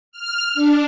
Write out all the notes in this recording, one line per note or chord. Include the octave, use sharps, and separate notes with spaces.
F6
D4